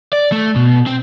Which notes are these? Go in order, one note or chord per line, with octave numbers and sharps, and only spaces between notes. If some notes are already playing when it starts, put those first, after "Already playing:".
D5
A3
B2
C4